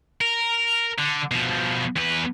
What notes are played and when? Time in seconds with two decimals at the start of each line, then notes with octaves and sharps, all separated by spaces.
0.21 A#4
0.99 D3
1.31 B2 F3
1.96 E2 B4